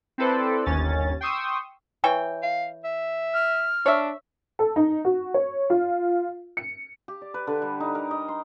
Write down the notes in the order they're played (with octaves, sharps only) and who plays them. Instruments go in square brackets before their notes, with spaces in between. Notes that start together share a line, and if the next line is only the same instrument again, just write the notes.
[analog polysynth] C4 E4 A4 B4 C5 D5
G1 D#2 C#4 A6
G5 C6 C#6 D#6 E6
[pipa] E3 C#5 G5
[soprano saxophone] F5
E5
[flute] F6
[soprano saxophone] D4 [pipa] C#5 E5
[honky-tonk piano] A4
D#4
F#4
C#5
F4
C#7
[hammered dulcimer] G4
D5
B4
D3
G3
D#4
A#4
D#5
C6